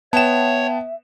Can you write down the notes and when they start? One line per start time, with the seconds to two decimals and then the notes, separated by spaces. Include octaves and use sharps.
0.13 B3 C#5 E5 G5 A5 E7